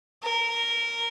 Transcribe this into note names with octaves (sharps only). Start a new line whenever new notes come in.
A#4